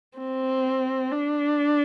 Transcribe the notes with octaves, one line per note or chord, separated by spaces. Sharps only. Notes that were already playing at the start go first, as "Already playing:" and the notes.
C4
D4